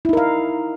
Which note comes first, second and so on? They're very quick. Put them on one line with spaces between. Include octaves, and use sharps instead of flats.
E4 D#4 A#4 F5